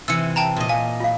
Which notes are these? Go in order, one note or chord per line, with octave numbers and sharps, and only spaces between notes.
C3 E3 E6 C#7
G5 A5 A#5
A#2 D#5
F5 G#5
F4 F5